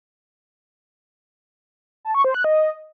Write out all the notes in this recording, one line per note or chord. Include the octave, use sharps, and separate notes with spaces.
A5
C#6
C5
F#6
D#5